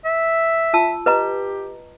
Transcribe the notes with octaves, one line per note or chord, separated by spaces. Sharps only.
E5
F4 A5 E6
G4 B4 D#5 A#5